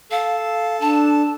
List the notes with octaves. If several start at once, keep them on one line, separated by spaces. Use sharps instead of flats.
A4 F5
D4 A5